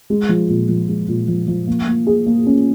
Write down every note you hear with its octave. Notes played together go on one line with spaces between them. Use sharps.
G#3
F3
A#2
F3
G#3
A#2
F3
F3
A#3
A#3
G#4
A#3
C#4